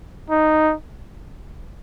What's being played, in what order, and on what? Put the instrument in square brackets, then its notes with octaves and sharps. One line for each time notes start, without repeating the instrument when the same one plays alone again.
[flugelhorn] D#4